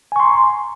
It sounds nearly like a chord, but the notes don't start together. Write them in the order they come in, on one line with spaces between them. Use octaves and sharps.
G#5 C#6 C6 A#5